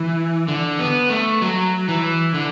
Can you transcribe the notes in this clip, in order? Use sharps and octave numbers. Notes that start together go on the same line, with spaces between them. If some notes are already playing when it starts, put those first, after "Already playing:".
Already playing: E3
D3
B3
A3
F#3
E3
D3